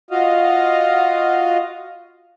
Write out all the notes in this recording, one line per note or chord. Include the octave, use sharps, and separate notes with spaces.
F4 F#4 D#5 F5